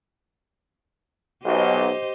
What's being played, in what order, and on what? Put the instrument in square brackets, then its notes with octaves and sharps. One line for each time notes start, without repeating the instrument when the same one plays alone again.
[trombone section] B1 [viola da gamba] G4 C5 D#5